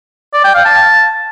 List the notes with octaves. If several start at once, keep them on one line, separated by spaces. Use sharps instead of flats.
D5
G5
F5
A5